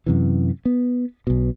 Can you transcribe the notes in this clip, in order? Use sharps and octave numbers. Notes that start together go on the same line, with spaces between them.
F#2 C3 E3
B3
B1 B2